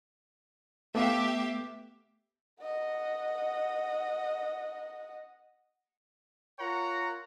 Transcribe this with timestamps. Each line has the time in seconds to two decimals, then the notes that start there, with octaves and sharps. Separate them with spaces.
0.95 A3 B3 G4 E5 F5 D6
2.61 D#5 F#5
6.58 F4 A#4 C#5 F#5 A#5